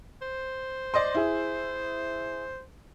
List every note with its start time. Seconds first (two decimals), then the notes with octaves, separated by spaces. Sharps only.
0.22 C5
0.94 D5 D#5 C6
1.15 E4 G#4